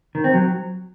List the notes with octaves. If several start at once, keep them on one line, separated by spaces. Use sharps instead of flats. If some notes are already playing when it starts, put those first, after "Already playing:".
D#3
C4
F#3